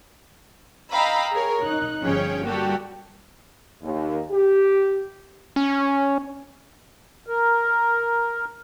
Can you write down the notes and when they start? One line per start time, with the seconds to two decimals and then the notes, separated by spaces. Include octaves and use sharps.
0.92 D#5 F5 G5 A#5 B5 E6
1.32 G#4 A#4 C#5
1.62 D#4 F#6
2.03 G1 F3 C#4 G#4 C#5 G5
2.45 G3 A#3 F#4 G4 A4
3.83 D#2
4.31 G4
5.56 C#4
7.27 A#4